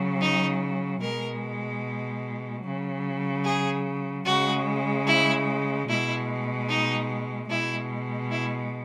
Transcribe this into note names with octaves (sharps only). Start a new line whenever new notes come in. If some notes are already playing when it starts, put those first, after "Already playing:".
Already playing: C#3 F#3
D#4
B2 G#3 A#4
C#3 F#3
G#4
C#3 G#3 F#4
E4
B2 G#3 E4
D#4
B2 G#3 E4
E4